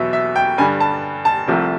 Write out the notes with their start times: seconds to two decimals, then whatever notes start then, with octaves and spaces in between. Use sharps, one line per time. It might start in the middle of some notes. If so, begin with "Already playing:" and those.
Already playing: E2 B2 F#3 E5
0.13 E5
0.36 G5
0.58 G2 D3 G3 G#5
0.80 A5
1.25 A5
1.47 C2 C3 F3 A3